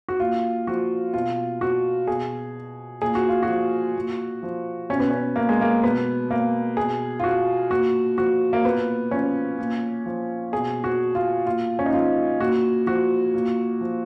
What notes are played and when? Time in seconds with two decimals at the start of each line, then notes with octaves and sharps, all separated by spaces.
0.08 F#4
0.20 A#2 F4
0.67 F3 F#4
1.14 B2 F4
1.61 F#4
2.07 B2 G#4
3.02 A#2 G#4
3.15 F#4
3.29 F4
3.43 F#4
3.49 F3
3.96 A#2
4.43 F3
4.90 B2 C#4
5.00 B3
5.10 C#4
5.36 A#3
5.49 G#3
5.61 A#3
5.83 B2 B3
6.31 A#3
6.77 B2 G#4
7.20 F4
7.24 F#4
7.71 A#2 F#4
8.18 F3 F#4
8.53 A#3
8.65 A#2 B3
9.11 F3 C#4
9.59 A#2
10.06 F3
10.52 B2 G#4
10.84 F#4
11.15 F4
11.46 A#2 F4
11.79 C#4
11.86 D#4
11.93 F3 F4
12.41 A#2 F#4
12.87 F3 F#4
13.34 A#2
13.81 F3